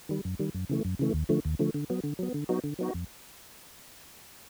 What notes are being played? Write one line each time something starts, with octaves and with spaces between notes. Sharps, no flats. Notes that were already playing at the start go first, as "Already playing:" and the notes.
D#3 G3
F#2
D#3 G3
F#2
C#3 E3 A3
F#2
C#3 E3 A3
D#2
D3 F3 A3
D#2
D3 F3 A3
D3
F#3 B3
D3
F#3 B3
D3
F#3 B3 D#4 F#4
D3
F#3 B3 D#4 F#4
F2